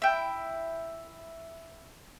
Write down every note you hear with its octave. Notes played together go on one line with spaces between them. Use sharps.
E4 G5